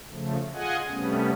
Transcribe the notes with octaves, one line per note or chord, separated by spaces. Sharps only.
C#3 F3 A3
F4 G#4 D#5 F#5 G#5
C3 G3 A3 B3 C#4